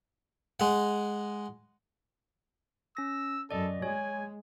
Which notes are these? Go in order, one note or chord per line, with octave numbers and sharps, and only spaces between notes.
G#3 F#5
C#4 E6 A#6
F#2 A4 D5 D#5
G#3 C#5 G#5